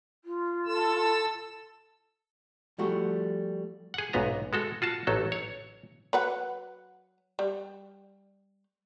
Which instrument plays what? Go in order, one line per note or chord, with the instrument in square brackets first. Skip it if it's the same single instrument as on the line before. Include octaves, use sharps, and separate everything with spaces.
[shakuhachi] F4
[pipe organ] A4 E6
[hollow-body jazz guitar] F3 G3 A3 F#4
[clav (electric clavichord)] G#4 F#5
B1 G#2 B3 A#5
G#3 F#4 A4
F4 F#4 A5
A1 F#3 A4
C#5
[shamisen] F#3 B4 F#5
G3